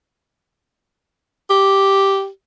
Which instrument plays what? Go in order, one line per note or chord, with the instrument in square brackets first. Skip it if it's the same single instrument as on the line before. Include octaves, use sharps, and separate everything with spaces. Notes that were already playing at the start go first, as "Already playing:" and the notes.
[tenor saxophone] G4